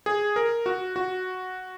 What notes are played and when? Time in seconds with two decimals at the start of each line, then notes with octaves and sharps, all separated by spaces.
0.06 G#4
0.36 A#4
0.66 F#4
0.96 F#4